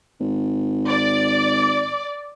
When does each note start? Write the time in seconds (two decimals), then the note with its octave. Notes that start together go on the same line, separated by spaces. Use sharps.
0.20 G#1
0.88 D5